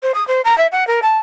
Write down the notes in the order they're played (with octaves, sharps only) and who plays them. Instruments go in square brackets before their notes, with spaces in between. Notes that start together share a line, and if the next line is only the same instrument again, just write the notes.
[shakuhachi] C5
D#6
C5
A#5
E5
F#5
A#4
A5